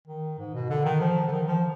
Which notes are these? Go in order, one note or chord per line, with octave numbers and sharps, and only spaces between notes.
D#3
G#2
B2
D3
D#3
F3
D3
D#3
F3